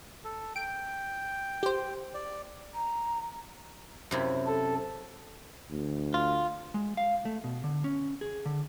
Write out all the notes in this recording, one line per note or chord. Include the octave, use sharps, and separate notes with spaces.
A4
G5 D7
G4 C5
D5
A#5
F#2 C3 E4
A4
D2
F4
G#3
F5
A3
B2
D3
C#4
G#4
D3